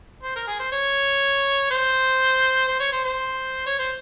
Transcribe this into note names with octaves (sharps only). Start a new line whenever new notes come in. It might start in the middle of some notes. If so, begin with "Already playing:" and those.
C5
A#4
G#4
C5
C#5
C5
C5
C#5
C5
C5
C#5
C5